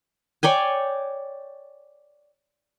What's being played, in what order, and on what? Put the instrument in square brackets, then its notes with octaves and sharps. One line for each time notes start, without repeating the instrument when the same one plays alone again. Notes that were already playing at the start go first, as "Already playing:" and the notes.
[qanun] C#5 D5 G5 G#5